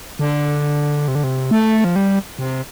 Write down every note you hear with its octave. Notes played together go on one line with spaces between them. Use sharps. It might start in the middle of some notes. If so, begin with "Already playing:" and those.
D3
C3
D3
C3
A3
F3
G3
C3